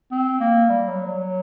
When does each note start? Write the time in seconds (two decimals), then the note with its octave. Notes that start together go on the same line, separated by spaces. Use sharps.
0.11 C4
0.41 A#3
0.69 G3
0.88 F#3
1.07 F#3